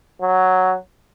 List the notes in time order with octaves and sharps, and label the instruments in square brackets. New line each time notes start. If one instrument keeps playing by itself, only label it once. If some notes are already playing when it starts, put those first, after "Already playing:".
[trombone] F#3